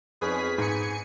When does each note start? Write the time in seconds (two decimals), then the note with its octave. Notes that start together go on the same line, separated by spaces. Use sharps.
0.21 F2 B3 C#4 D#4 G#4 B6
0.58 G#2 G#5 C#7